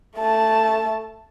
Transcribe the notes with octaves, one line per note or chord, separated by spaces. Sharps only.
A3 A5